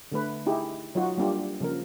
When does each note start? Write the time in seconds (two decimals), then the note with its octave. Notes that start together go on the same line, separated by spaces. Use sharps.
0.12 D3 A3 B4
0.46 D#4 E4 G4 G#4
0.95 F#3 D#4 F4 F#4
1.17 G3 A#3 D4 F4 G4
1.60 C#3 F3 A#3 A#4